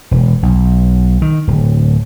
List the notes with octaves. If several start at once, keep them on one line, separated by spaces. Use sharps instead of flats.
E1
B1
D#3
D1